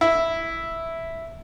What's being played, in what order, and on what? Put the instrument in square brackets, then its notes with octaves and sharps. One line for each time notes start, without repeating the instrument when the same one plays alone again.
[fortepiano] E4